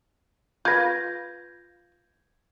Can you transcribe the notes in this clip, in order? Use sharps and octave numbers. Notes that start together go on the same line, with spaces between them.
F4 B4 G6 G#6 A#6